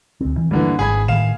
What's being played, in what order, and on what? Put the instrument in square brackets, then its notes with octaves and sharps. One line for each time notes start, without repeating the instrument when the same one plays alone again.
[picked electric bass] D2 C4
E3
[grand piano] G2 D3 E3 [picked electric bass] A3 A#3
[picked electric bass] G#1 [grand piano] G#4 B5 G#6
[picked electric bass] A2 D#3 A3 [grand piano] F5 E7